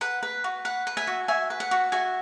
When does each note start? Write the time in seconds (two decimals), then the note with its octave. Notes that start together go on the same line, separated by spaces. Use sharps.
0.01 B4 F#5 B5
0.23 B4
0.44 F#4
0.65 B4 F#5
0.87 B4
0.97 E5 G#5
1.07 F#4
1.28 F#4 E5 G#5
1.50 B4
1.60 F#5
1.71 F#4
1.92 F#4 E5 G#5